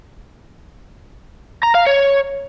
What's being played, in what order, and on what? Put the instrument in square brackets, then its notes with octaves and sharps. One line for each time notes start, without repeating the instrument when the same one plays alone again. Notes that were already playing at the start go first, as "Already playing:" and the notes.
[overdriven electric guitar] A#5
F5
C#5